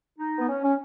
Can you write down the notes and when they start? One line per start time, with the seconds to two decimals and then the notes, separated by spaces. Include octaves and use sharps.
0.19 D#4
0.39 B3
0.49 C#4
0.63 C#4